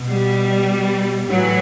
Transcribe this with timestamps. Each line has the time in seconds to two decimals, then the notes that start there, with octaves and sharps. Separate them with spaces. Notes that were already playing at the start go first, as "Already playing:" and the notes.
Already playing: B2
0.09 G3
1.29 A2 E3 F#3